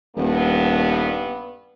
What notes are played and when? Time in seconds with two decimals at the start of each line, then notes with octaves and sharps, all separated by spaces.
0.16 D#1 G2 B3